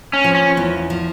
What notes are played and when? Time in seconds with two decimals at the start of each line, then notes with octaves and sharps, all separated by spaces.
0.13 C#4
0.24 F3
0.35 C#4
0.57 E2
0.90 F3